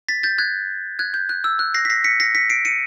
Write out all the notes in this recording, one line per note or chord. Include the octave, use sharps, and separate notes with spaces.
A6 B6
G6 A6
F#6 G#6
F#6 G#6
G6
F#6
E6
F#6
A#6 C7
B6
A#6 C7
B6 C#7
A#6 C7
B6 C#7
C7 D7
C#7 D#7